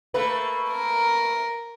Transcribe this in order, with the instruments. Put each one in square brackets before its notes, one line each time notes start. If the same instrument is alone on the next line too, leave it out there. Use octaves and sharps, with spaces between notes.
[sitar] A3 A#3 B4
[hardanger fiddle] A#4